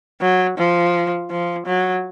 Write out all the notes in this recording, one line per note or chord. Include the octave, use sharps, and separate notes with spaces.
F#3
F3
F3
F#3